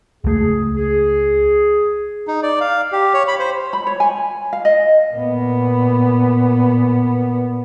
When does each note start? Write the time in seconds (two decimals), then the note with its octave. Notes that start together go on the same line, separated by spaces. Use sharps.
0.24 C#2 A3 G#4
0.75 G#4
2.27 D#4
2.43 D5
2.61 F5
2.92 G4
3.14 C#5
3.28 B5
3.40 C5
3.73 B5
3.87 C#5
4.00 G#5
4.53 F5
4.65 D#5
5.13 A#2 B3